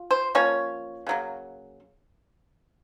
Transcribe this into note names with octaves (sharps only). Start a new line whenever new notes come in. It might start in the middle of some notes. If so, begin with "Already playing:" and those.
Already playing: F4
C5
F3 A#3 C#4 C#5
C#3 F#3 A#3